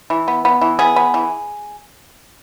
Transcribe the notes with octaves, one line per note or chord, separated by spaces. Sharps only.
E3
B3
B3
E3
B3 G#4
B3
E3